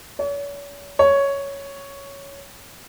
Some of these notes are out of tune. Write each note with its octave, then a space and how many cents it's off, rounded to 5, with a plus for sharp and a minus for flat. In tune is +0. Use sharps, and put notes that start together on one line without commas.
C#5 +40
C#5 +5